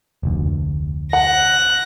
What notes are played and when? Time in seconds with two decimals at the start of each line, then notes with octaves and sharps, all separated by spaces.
0.23 F1 D2
1.13 F#5 F#6 A#6